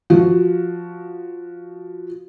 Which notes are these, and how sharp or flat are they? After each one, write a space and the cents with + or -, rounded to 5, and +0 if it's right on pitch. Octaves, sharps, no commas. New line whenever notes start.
F3 +0 F#4 +0